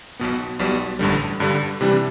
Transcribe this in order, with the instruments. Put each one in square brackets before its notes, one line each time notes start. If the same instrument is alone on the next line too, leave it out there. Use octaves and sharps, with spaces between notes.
[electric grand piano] B1 B2 B3
B1 B2 G3
A1 G2 D3 G3
G2 D3 G3
C3 E3 G3 D4